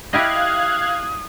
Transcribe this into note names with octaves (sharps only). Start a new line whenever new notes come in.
E4 G4 D#5 F5 D#6 F#6 G#6